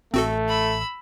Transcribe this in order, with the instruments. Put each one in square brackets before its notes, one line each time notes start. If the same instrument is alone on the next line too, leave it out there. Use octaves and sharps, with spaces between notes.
[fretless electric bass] A1 [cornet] A3 [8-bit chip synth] C4 F#4 A4
[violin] B5 E6